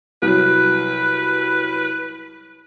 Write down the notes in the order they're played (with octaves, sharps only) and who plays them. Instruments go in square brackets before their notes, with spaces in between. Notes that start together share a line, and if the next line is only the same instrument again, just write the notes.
[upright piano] C2 F#3 [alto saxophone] B4